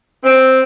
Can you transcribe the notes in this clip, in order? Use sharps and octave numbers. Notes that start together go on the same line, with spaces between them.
C4